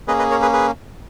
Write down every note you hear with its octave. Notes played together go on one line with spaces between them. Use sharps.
A#3 C#4 G#4 B4 D#5
B4 D#5
A#4 C#5
G#4 B4
G#4 B4